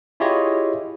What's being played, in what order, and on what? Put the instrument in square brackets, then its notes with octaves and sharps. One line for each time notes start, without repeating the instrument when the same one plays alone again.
[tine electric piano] E4 F4 G4 G#4 C#5 D#5